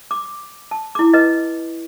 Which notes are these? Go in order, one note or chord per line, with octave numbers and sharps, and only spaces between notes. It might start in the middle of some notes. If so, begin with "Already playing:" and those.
D6
A5
E4 D6
B4 D#5